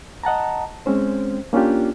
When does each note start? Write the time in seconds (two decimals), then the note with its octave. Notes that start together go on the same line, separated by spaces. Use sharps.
0.23 D#5 F#5 A5 A#5
0.86 G#3 C4 C#4 C5
1.53 A#3 C#4 D4 F4 G4